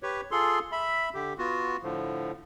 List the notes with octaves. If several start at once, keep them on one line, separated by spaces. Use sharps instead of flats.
G4 B4 C#5
F4 G#4 A4 C6
E5 B5
D3 G4
B3 F4 F#4
A2 D3 F3